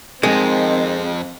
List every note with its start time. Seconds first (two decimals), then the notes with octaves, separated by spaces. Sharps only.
0.23 F2 D#3 G#3 C4